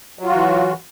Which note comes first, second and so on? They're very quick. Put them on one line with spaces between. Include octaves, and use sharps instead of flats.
F#3 F4 F#4 E3